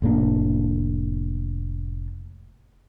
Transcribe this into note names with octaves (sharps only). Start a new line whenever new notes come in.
F1 A2 A#3 D4